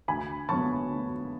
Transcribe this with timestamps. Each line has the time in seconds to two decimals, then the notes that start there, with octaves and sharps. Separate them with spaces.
0.08 D2 G#5 B5
0.49 D3 F#3 B3 A5 C#6
0.90 D2